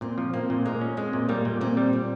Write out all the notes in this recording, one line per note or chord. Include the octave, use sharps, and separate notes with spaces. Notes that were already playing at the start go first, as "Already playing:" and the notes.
A#2 C4
F3
A#3 C4
A#2
G#3 A#3
C#4
G#3 C4
A#2
G3 A#3
A#2
A#2 C4
G3
C4